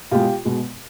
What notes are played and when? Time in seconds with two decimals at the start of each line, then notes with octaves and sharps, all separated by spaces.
0.11 B2 G#3 F4 G4
0.45 B2 G#3